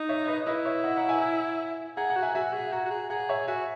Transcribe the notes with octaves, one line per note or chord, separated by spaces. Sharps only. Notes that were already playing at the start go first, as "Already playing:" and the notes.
Already playing: D#4
C#5 E5
B4 D#5
E4 B4 D#5
C#5 E5
D#5 F#5
F#5 A#5
E5 G#5
G#4 F#5 A#5
F#5 A#5
F#4
E5 G#5
F#4 E5 G#5
G#4
F#4 F#5 A#5
F#4
G#4
G#4 F#5 A#5
C#5 E5
F#4 E5 G#5